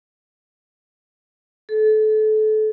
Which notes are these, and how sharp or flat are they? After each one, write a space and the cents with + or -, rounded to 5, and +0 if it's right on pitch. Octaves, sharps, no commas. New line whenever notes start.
A4 -30